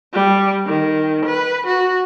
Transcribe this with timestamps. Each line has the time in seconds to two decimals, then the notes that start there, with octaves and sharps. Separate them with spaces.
0.13 G3
0.66 D#3
1.25 B4
1.66 F#4